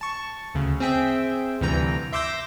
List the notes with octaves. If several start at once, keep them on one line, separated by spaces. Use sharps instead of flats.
A5 C#6
D2 C#3
C4 G#4 E5 G5
D2 G2 C3 E3 G5 A#5
E5 C6 D6 E6 G6 A#6